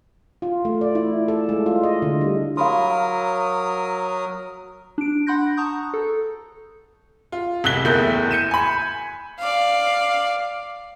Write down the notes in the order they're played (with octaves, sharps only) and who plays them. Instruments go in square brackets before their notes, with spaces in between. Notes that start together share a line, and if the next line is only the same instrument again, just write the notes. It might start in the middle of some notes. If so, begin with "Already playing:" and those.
[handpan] F4
A3
D5
E4
A4
G#3
F4
D#5
D3
G3
[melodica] F#3 A#4 D#6 [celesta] F5 B5 C6
[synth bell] D4 D7
F#5 B5 C6 F#6 G6 A#6
A5 A#5 C#6 D#6 G6
A4
[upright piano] F4
F1 C2 F#6 B6 G7
F#1 E2 A3 E4 A#4 G6
G6 C#7 D#7 E7
G#5 B5
[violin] D5 F5